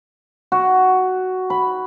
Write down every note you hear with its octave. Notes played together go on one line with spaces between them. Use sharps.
F#4
B5